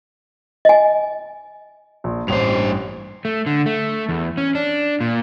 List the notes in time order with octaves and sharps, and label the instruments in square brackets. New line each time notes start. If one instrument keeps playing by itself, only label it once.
[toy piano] D#5 G#5
[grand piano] A#1
[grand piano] A1 F7 [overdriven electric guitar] G2 C5
[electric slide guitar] A3
D3
A3
E2
C#4
D4
A#2